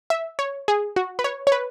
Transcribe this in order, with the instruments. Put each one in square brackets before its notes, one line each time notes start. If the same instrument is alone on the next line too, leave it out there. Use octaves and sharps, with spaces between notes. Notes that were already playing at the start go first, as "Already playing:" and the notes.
[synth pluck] E5
C#5
G#4
F#4
B4
C#5
C#5
B4